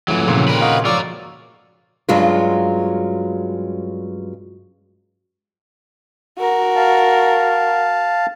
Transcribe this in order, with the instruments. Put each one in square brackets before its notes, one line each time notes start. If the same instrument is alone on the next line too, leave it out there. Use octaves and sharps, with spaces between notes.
[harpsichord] F2 G#2 [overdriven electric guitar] E3 F#3 [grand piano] A3
[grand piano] A#2 C#3
[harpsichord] D3 D#3 C4 [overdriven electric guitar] A#4 B4 [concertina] B5
[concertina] F#4 D#5 F5
[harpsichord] G#2 F3 F#3 [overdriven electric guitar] F4 A#4 [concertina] D5 C#6 E6
[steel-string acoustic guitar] G2 F#3 G#3 C#4 F4
[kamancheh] F#4 A#4
[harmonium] F5 A5